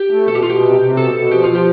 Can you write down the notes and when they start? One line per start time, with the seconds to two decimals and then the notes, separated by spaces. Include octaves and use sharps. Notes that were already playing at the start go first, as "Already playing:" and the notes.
Already playing: G4
0.11 A3
0.27 B2 A4
0.35 G4
0.42 B2 F4
0.50 G4
0.62 C3
0.80 C3
0.97 B2 A4
1.14 B2
1.31 F3 G4
1.44 F3 F4
1.55 G4